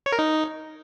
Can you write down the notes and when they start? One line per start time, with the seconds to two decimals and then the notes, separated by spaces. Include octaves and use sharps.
0.06 C#5
0.12 A#4
0.19 D#4